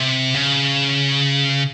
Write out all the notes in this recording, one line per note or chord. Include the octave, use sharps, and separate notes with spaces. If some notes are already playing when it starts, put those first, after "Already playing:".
Already playing: C3
C#3